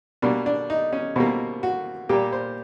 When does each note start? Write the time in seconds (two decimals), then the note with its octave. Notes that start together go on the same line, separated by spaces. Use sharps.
0.22 B2 G3 A#3 D4
0.46 D4
0.70 D#4
0.93 C#4
1.16 B2 G3 A#3 C4
1.63 F#4
2.09 A#2 G3 A#3 G4
2.33 C5